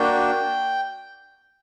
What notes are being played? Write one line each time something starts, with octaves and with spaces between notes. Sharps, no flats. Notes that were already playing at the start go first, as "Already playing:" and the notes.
Already playing: A#3 D4 F#4 G5